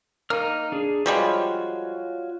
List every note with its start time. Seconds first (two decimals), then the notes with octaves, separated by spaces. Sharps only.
0.30 A#3 D#4 F6
0.72 D4 G#4
1.06 F3 G3 G#3 F4 F#4 C#5